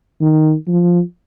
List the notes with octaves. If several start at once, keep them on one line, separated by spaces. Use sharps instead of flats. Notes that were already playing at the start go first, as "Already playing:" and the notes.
D#3
F3